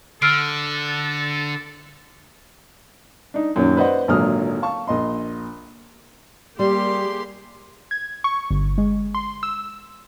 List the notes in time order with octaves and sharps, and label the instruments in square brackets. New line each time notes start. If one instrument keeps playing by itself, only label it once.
[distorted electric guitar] D3 [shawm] A4 [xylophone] E6 F6 C7 [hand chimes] D7
[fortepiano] D4 D#4
F#2 A#2 D#3 C#4
B4 C5 D5 D#5 F#5
G#1 A#2 D3 F#3 D#6 F6
F5 A5 C#6
A#1 D#5 C6
[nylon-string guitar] G3 [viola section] A#3 G4 G#4 [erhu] C6
[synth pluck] G#6
C#6
G1
G#3
C6
E6